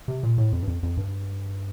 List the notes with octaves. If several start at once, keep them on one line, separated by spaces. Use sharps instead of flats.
C3
A#2
A2
F2
G2
F2
F2
G2